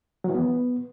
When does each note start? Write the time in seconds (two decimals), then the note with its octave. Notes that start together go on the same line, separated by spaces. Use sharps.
0.24 F#3
0.30 E3
0.35 B3